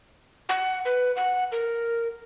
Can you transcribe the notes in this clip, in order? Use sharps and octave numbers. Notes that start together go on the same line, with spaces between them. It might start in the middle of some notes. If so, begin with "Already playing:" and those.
F#5
B4
F#5
A#4